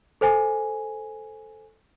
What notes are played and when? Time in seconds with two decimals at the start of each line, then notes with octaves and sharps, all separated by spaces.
0.21 A4 C5 G#5